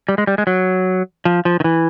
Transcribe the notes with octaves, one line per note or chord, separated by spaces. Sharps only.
G3
G#3
G3
G#3
F#3
F3
F3
D#3
E3